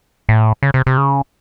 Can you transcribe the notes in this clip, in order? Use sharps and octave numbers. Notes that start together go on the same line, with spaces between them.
A2
C#3
C3
C3
C#3